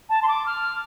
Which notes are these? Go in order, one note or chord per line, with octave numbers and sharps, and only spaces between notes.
A5
C6
D6
F6